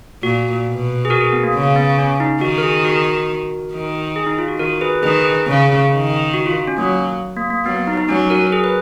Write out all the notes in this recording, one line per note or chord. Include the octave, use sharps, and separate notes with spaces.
A#2 F#4
B2
G#4
F#4 A#4
G#4
B3
A#3
C#3
B3
C#4
D#4
D#3 F#4
A#4
G#4
F#4 A#4
D#3
G#4
D#4
F4
F#4
D#3 F#4 A#4
G#4 B4
D#3 G#4 B4
A#4
G#4
C#3
D#3
F#4
F4
C#4
F#3 A#3
A#3
A#3
F#3 B3
B3
D#4
D#4
F#3 C#4
F#4 A#4
A#4
G#4
B4